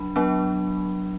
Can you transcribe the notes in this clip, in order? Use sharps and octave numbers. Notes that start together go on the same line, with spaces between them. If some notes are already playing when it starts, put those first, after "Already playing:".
Already playing: F#3 D4 B5
F#3 B3 D4